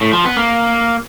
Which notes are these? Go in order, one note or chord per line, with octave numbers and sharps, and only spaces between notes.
A2
F3
B3
A#3